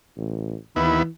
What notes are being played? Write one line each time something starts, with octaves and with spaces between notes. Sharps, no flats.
A1
D#2 E3 B3 E4 B5